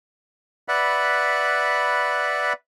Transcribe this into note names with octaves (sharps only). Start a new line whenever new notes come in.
B4 D5 E5 F#5 B5